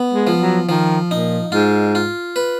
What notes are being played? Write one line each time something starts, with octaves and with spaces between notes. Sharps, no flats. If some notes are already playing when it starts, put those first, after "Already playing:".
Already playing: B3
G#3
F3
F#3
D#3 F3
A#2 D#4
G#2 F4
F4
B4